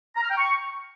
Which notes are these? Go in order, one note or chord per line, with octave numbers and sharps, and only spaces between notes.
A#5
F6
G5
C#6